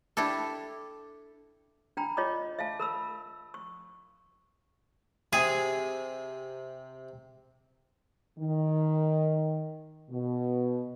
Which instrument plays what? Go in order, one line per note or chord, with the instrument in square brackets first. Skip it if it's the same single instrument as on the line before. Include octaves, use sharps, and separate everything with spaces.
[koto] D4 E4 G4 A4
[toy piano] D4 G5 A#5 B5
F4 C#5 D#5 B5 D6
E5 F5 A5
A#4 B5 E6
C#6
[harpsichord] C3 [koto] G#4
[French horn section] D#3
B2